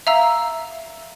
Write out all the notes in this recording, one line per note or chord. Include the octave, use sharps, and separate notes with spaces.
E5 F5 A#5 E6